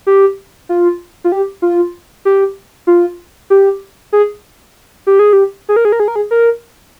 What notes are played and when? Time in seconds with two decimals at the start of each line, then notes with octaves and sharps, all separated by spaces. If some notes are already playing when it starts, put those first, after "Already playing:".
0.07 G4
0.69 F4
1.24 F4
1.32 G4
1.62 F4
2.25 G4
2.87 F4
3.50 G4
4.13 G#4
5.07 G4
5.19 G#4
5.33 G4
5.69 G#4
5.76 A#4
5.85 G#4
5.92 A#4
6.00 G#4
6.08 A#4
6.16 G#4
6.31 A#4